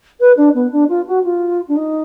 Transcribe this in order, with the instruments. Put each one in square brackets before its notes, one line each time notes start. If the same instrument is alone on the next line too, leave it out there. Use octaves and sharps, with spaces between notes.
[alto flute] B4
D4
B3
D4
F4
F#4
F4
D4
D#4